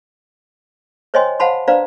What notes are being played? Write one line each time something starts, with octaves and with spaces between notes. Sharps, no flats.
C5 C#5 D#5 G5 G#5 C6
C5 F5 F#5 A5 B5 C6
D4 B4 C5 D5 F5 A#5